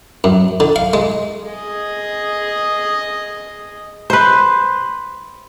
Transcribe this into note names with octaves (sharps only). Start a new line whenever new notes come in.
F#2
D3
F5
G#3
G#4 D#5
B4 C5